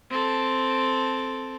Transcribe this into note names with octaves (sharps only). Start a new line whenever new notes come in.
C4 A4